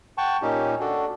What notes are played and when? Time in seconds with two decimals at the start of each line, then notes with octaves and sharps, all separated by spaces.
0.18 F#5 G5 A5 C#6
0.42 A#2 C#4 D#4 G4
0.80 D4 F#4 A4